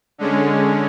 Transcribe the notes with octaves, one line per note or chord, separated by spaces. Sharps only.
D3 G#3 C#4